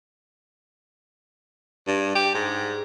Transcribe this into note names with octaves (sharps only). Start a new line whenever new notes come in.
G2
G4
G#2